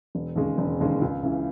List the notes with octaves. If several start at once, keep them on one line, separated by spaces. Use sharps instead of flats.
E1
D#2 C#3 G#3
E1
D#2 C#3 G#3
C#2
C#3 E3